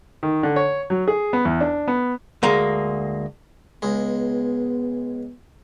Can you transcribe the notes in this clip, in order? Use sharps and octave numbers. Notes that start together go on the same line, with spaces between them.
D#3
D3
C#5
F#3
G#4
B3
E2
D4
B3
D2 G#3 A#3
C#2 G#3 B3